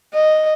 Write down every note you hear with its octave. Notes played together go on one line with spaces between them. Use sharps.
D#5